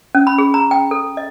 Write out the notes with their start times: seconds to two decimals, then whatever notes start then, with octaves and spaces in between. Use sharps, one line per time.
0.15 C#4
0.27 B5
0.38 G#4
0.54 A#5
0.71 G5
0.91 A4
1.17 D#5